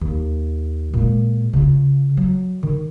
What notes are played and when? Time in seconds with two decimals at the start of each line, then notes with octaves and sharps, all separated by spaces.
0.01 D#2
0.93 A#2 G#3
1.53 C#3 F4
2.17 F#3
2.63 D#3